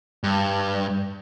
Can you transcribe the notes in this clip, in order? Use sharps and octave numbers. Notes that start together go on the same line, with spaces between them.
G2